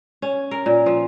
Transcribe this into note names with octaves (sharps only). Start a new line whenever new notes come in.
C#4
A#4
A#2
F3